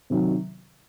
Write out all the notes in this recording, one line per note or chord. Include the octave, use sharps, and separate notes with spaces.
C3 D#3 F#3